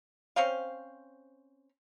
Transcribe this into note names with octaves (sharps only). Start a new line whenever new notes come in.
C4 C#4 C5 F5